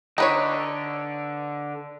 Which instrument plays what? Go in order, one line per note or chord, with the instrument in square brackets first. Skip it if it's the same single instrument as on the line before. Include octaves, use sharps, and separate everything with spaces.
[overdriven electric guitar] D3 [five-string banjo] D#4 B4 C#5